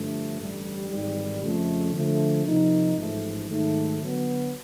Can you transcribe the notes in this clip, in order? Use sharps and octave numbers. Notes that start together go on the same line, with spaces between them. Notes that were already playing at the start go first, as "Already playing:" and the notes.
Already playing: G2 D3 F3 A3
A1 G2 D3 G3
G#1 G#2 E3 G3
F2 C#3 F3 A3
D3 F3 A3
C3 F3 A#3 D#4
A1 G#2 F3 A3
G#2 D#3 F#3 A3
D3 F#3 B3